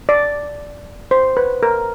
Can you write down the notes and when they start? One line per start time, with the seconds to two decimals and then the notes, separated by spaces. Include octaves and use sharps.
0.09 D5
1.11 C5
1.37 B4
1.63 A#4